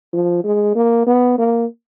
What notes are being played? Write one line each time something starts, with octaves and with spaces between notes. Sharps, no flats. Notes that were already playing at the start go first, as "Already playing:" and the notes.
F3
G#3
A#3
B3
A#3